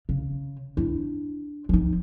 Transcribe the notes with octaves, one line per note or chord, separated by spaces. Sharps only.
C#3
D4 E4
F3 D#4